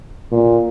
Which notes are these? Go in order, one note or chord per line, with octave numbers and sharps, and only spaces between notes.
A#2